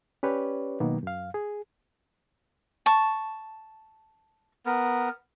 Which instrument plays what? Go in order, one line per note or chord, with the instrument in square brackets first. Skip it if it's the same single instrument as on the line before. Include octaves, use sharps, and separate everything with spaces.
[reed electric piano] C#4 G4 B4 C#5 D5
B2 D#3 F#3 A#3 B3
F#2 F5
G#4
[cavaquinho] A5 C#6
[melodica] B3 A#4